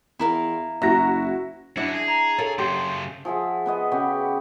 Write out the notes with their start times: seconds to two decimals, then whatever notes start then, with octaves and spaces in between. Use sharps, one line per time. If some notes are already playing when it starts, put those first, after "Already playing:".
0.19 E2 E4 A#4 F5
0.82 F#1 E4 F#4 A#5 A#6
1.77 F#2 D4 E4 F#4
1.93 G#4
2.08 A#5
2.38 A4 A#4 C#5 F5
2.59 F#2 C#3 G4 C6
3.25 F3 G#4 E5 F#5
3.66 B3 B4 D#5
3.92 C#3 B3 F#4 G4